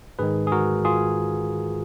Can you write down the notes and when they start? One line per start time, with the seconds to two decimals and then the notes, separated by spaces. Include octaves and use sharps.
0.19 G#2 D#3 G#3 G#4 B4
0.47 G#4
0.52 F#4 A#4
0.85 F4 G#4